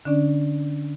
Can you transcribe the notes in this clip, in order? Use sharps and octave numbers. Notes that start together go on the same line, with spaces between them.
D3 C#4 D4 D5